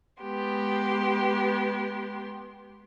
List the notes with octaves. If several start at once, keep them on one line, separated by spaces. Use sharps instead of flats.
G#3 B3 G4 C6